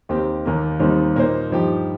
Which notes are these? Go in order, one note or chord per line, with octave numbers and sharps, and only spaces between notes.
D#2 D#3 C4 G4
D#2 D#3 A#3
D#2 D#3 G3 C4 D#4
A#2 A#3 D#4 C5
G2 F3 D#4 G4